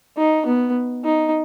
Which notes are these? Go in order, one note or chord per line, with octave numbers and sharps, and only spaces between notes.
D#4
B3
D#4